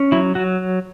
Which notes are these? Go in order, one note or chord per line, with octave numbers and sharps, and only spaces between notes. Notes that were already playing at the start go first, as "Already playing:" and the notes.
Already playing: C#4
F#3 E4
F#3 F#4